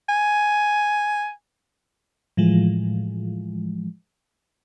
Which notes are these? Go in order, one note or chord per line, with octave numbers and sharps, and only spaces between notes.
G#5
A2 E3 F3 G#3